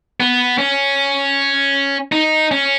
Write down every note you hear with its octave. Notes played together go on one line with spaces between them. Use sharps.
B3
C#4
D#4
C#4